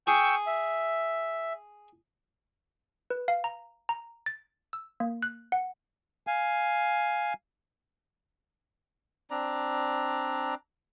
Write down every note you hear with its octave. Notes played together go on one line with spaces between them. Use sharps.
G#4 G5 C#6 E6
E5
B4
F5
A#5
A#5
A6
E6
A#3
F#6
F#5
F5 G#5
C4 D4 D5 A#5